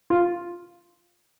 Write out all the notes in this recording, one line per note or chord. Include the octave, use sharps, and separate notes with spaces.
F4